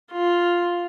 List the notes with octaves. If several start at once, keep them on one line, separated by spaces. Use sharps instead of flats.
F4